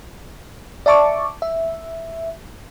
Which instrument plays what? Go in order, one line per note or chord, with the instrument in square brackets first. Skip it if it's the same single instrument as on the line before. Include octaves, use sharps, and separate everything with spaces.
[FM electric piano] D5 E5 A5 C#6 D6
E5